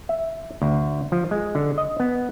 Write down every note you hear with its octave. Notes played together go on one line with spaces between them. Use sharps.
E5
D2
F3
G#3
D3
D#5
B3